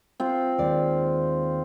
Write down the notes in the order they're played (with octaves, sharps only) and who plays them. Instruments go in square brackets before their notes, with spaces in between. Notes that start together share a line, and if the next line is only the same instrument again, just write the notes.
[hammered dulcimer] C4 F4
[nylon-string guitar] D#2 G#3 D5